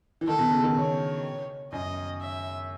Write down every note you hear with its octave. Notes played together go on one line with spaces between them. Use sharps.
E3
D#3 A4
B2
C#3
D#3
B2 C#5
F#2 D#5
E5